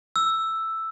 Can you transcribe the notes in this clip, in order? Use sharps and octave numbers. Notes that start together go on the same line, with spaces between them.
E6